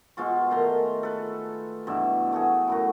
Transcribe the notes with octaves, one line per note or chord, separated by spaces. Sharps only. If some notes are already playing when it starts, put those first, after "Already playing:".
B2 G#3 F4 C#6
D#3 A3 A#5 C6
A4 B4
G2 B2 E3 E5
A3 F#4 G#4
F#2 A2 F#4